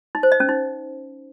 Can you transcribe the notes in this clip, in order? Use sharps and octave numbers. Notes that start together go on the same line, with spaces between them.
D#4
C5
D#5
C#4
D#4